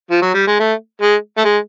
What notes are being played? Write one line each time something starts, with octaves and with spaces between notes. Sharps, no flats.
F3
F#3
G3
G#3
A3
G#3
A3
G#3